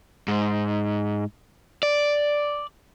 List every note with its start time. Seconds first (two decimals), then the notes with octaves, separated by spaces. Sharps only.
0.28 G#2
1.83 D5